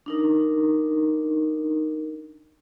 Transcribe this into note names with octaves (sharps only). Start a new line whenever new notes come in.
D4 D#4 A#4